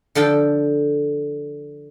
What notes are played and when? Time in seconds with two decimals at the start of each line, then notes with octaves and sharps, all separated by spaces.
0.15 D3 F3 A4 G5